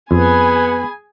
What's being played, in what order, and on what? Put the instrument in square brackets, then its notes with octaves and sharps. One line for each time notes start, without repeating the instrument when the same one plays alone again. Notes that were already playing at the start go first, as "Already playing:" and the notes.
[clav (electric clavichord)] F2 [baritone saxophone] B3 [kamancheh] G#4 G#5 [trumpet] B5